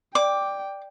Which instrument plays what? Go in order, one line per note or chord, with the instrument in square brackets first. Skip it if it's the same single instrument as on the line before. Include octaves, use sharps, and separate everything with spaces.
[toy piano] D5 [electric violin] G5 [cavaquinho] D6